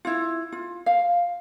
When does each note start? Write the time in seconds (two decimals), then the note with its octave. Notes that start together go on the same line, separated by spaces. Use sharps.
0.05 E4 F4
0.52 F4
0.86 F5